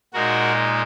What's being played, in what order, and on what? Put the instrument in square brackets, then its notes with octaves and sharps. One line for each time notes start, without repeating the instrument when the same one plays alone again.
[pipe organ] A#2 G#3 D#4 F#4 A#4